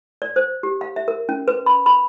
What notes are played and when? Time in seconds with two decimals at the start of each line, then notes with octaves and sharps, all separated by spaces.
0.22 D5
0.36 C5
0.63 G4
0.81 F5
0.96 E5
1.08 A#4
1.29 C#4
1.48 B4
1.66 B5
1.86 B5